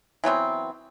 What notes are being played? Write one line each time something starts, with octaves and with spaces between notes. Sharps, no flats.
E3 F#3 B3 C4